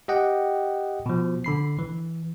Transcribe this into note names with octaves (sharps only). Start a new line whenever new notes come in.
G4 D#5 F#5 G5
B2 F3
D3 B5 C7
E3